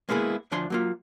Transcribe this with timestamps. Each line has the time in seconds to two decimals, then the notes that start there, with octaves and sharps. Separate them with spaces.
0.09 G#3 A#3 B3 E4 G#4
0.51 D2 F3 D4 G#5 C6
0.70 F#3 A#3 F4